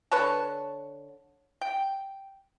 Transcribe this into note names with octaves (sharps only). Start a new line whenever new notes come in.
D3 B4 C#5 A5
G5